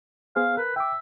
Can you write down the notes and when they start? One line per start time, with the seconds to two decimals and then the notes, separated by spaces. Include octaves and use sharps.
0.36 B3 G#4 C5 F5
0.57 A#4 B4
0.76 E5 G5 D6